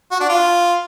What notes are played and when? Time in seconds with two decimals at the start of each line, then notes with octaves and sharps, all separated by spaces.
0.11 F#4
0.20 D4
0.29 F4